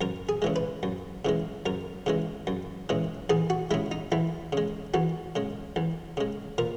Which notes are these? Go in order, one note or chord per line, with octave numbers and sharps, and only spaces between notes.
F#2 A#4
G#4
C#3 E3 G#3
B4
F#2
C#3 E3 G#3
F#2 A#4
C#3 E3 G#3
F#2
C#3 E3 G#3
E2 G#4
F#4
C#3 G#3 E4
D#4
E2 E4
C#3 G#3
E2 F#4
C#3 G#3
E2
C#3 G#3
A#2 A#4